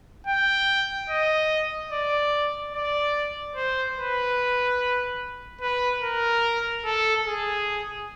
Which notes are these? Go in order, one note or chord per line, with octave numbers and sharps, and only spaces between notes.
G5
D#5
D5
D5
C5
B4
B4
A#4
A4
G#4